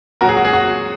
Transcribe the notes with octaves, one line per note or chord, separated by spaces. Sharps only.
A#2 F#3 F#4 A#4
G#4
F#4
G#4
F#4